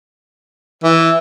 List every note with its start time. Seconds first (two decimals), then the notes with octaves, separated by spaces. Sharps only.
0.83 E3